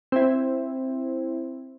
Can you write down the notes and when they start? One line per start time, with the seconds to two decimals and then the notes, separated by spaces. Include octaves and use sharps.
0.12 C4 E4